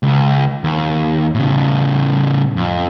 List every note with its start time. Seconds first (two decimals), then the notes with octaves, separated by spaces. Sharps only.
0.03 C#2
0.64 D#2
1.34 A2 C#3
2.56 F2